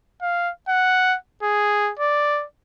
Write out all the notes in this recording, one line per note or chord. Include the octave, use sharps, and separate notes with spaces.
F5
F#5
G#4
D5